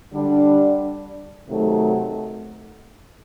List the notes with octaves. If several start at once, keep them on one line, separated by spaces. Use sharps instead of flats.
D3 G3 D4
C3 D#3 F#3 A3